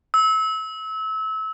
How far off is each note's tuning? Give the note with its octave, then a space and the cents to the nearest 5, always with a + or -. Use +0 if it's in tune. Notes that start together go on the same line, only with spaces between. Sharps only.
E6 -30